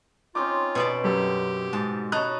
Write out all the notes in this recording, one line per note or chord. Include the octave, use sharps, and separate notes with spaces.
C4 C#4 D#4 F4 D6
B2 B3 D5
F#2 G4 A4
G#2 A5
D#4 C#5 A5 B5 F#6